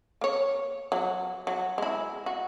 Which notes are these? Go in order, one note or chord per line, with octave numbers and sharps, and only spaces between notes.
A#3 C#5
F#3
F#3
G#3 E4
F#4